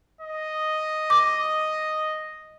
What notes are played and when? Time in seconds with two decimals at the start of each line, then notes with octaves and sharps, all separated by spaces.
0.21 D#5
1.10 D6